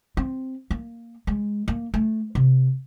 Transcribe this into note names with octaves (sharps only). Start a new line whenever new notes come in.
C4
A#3
G#3
A#3
A3
C3